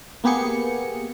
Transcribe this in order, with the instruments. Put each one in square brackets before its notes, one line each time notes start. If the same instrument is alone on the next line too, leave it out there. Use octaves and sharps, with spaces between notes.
[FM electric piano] A#3 B3 G4 G#4 C#7